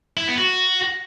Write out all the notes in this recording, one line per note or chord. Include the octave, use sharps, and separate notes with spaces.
E4
B3
F#4